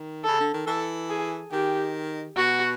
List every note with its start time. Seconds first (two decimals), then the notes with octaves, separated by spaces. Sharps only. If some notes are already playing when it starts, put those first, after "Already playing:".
Already playing: D#3
0.24 C#3 A4
0.40 D3
0.54 D#3
0.67 E3 A4
1.10 G#4
1.52 D#3 G4
2.37 B2 F#4